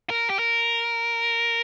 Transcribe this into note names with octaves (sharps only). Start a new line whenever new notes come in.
A#4
G4
A#4